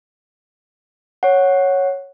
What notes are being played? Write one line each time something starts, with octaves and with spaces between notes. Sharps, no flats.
C#5 F#5